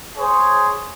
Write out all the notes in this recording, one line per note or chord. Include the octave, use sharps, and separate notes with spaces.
G#4 C5 C#5